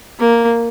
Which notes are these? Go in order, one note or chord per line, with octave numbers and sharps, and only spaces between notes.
A#3